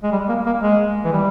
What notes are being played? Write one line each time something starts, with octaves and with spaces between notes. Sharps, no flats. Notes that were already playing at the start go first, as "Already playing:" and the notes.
G#3
G3
A#3
A#3
G#3
E3
G3